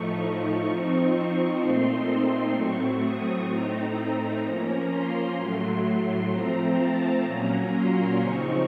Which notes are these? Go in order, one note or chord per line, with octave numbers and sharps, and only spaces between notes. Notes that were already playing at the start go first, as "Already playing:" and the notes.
Already playing: A2 F3 A3 D#4 C#6
F3 C4 D#4
A#2 A3 C4 D#4 C6
A2 F#3 A3 C4 C#6
D#6
A2 A3 C4 D#4 A#5
F3 A#3 C#4
C6
A2 F#3 A3 C6
F3 A3 C4 A#5
A5
A#2 F#3 A#3 C#4 A#5
C6
C#3 F3 C4 D#4 C#6